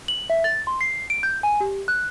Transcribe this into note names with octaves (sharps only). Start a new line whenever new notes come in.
F#7
E5
A6
C6
C7
D7
G6
G#5
G4
F#6